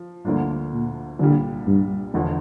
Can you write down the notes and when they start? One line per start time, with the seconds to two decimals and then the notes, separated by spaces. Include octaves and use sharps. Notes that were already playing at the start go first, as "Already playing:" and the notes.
Already playing: F3
0.25 D2 G2 D3 F3 A#3 D4
0.73 A#2
1.19 C2 A#2 D3 G3
1.67 G2
2.14 E1 E2 D3 F3